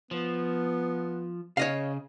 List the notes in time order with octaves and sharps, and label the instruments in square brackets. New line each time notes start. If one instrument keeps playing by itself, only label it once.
[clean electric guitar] F3 [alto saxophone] B3
[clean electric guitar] C#3 [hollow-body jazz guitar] C#5 D#5 F5